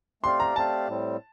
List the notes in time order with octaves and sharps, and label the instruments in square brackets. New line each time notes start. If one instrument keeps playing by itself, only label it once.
[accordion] A3 C4 G4 D5 F5 [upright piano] C6
[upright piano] A#5
[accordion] A3 C4 G4 D5 F5 [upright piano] A5
[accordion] A2 G3 C4